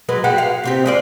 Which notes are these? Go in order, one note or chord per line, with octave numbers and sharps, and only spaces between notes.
F#3 G#3 B4
G#3 F#4 G4
F5
C3 C4 G4
G#3 F4 D5